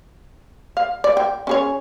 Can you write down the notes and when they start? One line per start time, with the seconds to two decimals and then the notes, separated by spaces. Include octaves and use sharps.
0.77 F5
1.04 D5
1.17 G5
1.47 C#4 G#4 C#5